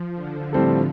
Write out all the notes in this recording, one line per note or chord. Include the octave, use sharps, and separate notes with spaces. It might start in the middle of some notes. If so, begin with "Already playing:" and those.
Already playing: F3
D3
A2 G3 C4 A4